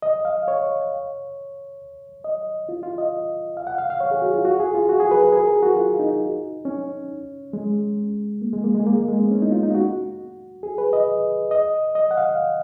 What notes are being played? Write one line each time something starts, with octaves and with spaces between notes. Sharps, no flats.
D#5
F5
C#5
D#5
F4
F4
D#5
F5
F#5
F5
F5
C#5
G#4
F#4
F4
F#4
G#4
F4
F#4
G#4
B4
A#4
G#4
A#4
F#4
F4
D#4
C#4
G#3
A#3
G#3
A#3
G#3
A#3
G#3
G#3
B3
C#4
D#4
F4
D#4
F#4
G#4
B4
D#5
D#5
D#5
F#5
F5